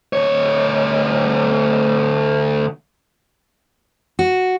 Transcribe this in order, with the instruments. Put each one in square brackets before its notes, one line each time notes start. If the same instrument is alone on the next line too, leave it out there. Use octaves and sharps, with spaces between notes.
[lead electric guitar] D2 C#5
[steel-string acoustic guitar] F#4